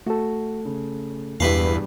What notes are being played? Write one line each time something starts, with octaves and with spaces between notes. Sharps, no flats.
A3 F#4 A4
C#3
E1 E2 G2 E4 G4 B4 F5